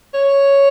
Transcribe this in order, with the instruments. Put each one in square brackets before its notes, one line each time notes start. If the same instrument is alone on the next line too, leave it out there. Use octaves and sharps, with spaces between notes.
[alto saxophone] C#5